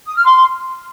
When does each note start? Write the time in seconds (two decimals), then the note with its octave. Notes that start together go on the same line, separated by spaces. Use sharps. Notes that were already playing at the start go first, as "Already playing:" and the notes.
0.06 D#6
0.15 F6
0.24 C6